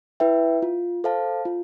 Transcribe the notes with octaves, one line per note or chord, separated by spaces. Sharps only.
E4 B4 E5 G5
F4
A4 C5 F5 A5
F4